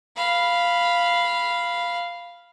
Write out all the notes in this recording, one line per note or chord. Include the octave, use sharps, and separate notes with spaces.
F5 B5